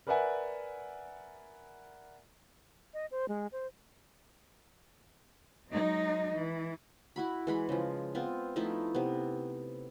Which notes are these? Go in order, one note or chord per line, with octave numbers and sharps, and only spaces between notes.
A#4 B4 D5 E5 F#5 G#5
D#5
C5
G#3
C5
F#3 G#3 D#4 D#5
E3
E4 F#4 B5
E3 G#3 B5
C#3 F3
B3 C4 F4
F3 A3 D#4 E4
C3 B3